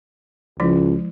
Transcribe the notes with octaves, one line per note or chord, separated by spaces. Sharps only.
C#2 F3 G#3 E4